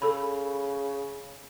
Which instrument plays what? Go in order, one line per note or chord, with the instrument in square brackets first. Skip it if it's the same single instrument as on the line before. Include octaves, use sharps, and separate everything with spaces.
[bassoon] C#3 [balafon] A4 B5